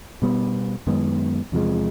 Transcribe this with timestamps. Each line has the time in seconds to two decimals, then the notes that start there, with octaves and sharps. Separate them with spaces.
0.22 B2 G3 B3
0.87 F#2 D#3 G#3 B3
1.52 E2 C3 F3 G#3